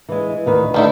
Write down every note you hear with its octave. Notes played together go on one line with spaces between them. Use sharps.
E3 G#3
D2 D#3 B4
D3 G3 A3 D#4 E4